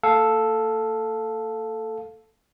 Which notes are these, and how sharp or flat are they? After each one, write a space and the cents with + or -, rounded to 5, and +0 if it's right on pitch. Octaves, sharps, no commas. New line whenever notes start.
A#3 -45 A4 +0 F5 +0